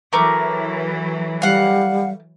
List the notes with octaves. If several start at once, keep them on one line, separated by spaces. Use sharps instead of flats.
E3 F#3 A3 A#4 D6
G3 F5 F#5